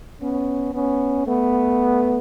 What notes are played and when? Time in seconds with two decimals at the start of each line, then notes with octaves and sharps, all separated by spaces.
0.21 B3 C#4
0.74 B3 C#4
1.27 A3 B3